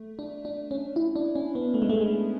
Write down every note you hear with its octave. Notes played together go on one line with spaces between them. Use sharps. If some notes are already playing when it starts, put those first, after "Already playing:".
Already playing: A3
D4
D4
C#4
E4
D4
C#4
B3
A3
G#3
A3
G#3